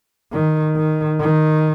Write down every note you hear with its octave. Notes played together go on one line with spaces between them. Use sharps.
D#3
D#3
D#3